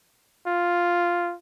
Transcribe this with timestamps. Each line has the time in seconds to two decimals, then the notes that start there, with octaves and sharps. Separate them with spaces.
0.46 F4